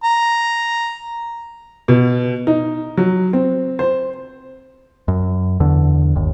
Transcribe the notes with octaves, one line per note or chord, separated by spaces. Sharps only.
A#5
B2
D#4
F#3
C4
C5
F#2
E2 D3
G1 D#2